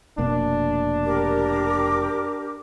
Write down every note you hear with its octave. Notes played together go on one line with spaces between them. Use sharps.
F1 B2 A#3 D4
G4 A#4 D6